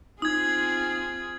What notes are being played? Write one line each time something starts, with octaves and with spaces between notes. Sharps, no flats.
C4 D#4 F4 G#4 D#6 G#6